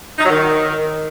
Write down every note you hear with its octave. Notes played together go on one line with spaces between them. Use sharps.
D#4
F#3
D#3